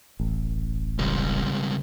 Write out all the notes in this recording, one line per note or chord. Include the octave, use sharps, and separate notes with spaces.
D#1 A1
C#2 G3